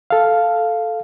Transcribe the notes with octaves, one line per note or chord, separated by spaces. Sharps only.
A4 F5